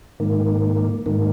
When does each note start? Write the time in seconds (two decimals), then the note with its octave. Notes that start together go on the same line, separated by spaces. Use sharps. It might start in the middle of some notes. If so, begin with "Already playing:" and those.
0.20 G#2 D#3 A#3
1.06 G#2 D#3 A#3